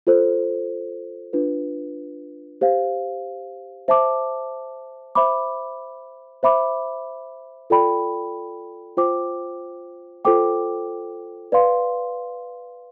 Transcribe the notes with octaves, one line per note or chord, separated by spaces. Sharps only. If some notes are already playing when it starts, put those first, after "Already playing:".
F4 A4 C5
D4 F4 B4
G4 C5 F5
C5 E5 A5 D6
C5 E5 B5 D6
C5 E5 B5 D6
F4 A4 D5 G5 B5
F4 C5 G5 D6
F4 A4 C5 G5 D6
B4 D5 F5 C6